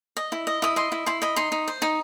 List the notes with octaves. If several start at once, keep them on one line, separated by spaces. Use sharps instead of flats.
D#5
E4
D#5
E4 D#6
D#5 C6
E4
E4 C6
D#5 B5
D#4 C6
D#4
C5
D#4